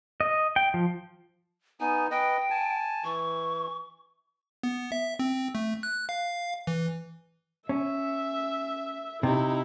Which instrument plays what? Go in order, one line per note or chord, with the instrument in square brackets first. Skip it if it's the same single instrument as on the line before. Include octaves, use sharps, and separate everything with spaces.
[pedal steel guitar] D#5
G5
F3
[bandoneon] B3 D#4 [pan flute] G#5
[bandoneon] B4 D#5 [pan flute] G5
[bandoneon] G#5 A5
[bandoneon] E3 [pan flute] C#6
[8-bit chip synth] B3
E5
C4
A3
F#6
F5
E3
[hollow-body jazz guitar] C#4 [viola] E5
[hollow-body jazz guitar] C3 [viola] D#4 E4